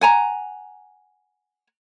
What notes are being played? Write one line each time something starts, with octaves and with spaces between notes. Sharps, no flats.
F#5 G#5 A#5